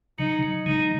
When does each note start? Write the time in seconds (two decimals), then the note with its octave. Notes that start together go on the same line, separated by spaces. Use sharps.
0.18 C#3 F#3 D#4
0.43 C#3 F#3
0.66 D#3 G#3 D#4